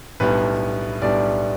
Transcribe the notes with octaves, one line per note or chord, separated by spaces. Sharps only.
B1 A2 G3 B3 D4 B4
B1 A2 G3 B3 D4 D5